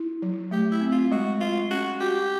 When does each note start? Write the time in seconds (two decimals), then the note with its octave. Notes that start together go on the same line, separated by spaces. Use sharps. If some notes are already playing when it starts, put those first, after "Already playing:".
Already playing: E4
0.22 F#3
0.51 A3 G4
0.72 E4
0.81 C4
0.92 F4
1.12 G#3 F#4
1.41 G#3 F4
1.71 C#4 F#4
2.00 F#4 G4